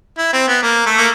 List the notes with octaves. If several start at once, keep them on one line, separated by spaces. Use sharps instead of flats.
E4
C4
B3
A#3
A3
A#3